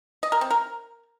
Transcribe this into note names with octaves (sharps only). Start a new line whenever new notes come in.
D#5
A#4
C4
A#4